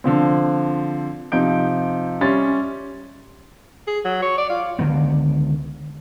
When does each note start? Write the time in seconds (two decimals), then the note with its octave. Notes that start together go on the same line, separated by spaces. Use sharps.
0.04 D3 F3 C4
1.32 C3 F3 D#4 G6 D7
2.21 G3 C#4 E5 C6 A6
3.88 G#4
4.05 F#3
4.22 C#5
4.38 D5
4.50 F4
4.79 C#2 D3 D#3 B3